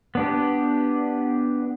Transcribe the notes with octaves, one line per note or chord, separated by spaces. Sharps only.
B3 D4 G4